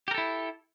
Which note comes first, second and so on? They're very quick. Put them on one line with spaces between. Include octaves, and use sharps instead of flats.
G4 A#4 A4 E4